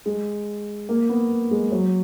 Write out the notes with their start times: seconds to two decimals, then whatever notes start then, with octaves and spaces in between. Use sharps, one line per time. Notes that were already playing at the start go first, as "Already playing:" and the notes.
0.06 G#3
0.89 A#3
1.09 B3
1.51 G#3
1.72 F#3